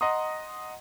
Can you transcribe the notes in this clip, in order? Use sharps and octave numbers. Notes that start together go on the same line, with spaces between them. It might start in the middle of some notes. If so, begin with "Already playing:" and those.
D#5 F#5 A#5 C6 D#6